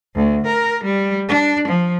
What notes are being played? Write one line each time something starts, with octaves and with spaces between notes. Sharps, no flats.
D2
A#4
G3
D4
F3